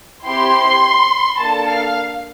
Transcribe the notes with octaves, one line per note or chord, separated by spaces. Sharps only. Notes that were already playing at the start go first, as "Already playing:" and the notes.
C4 E4 G4 C6
A#3 D4 A4 A5
F5